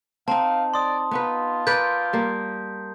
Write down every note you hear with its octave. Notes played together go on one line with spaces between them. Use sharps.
C4 D#4 F5 A5
D5 C6 D#6
B3 D#4 F4 B4
A#4 B4 D5 G6
G3 A#3